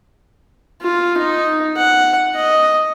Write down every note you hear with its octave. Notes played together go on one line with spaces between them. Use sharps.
F4
D#4
F#5
D#5